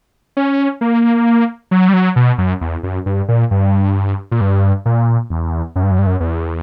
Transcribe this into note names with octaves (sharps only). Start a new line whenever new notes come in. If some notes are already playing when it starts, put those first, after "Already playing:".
C#4
A#3
F#3
G3
F#3
B2
F#2
E2
F#2
G2
A#2
G2
A#2
G2
A#2
E2
F#2
G2
F#2
G2
F#2
E2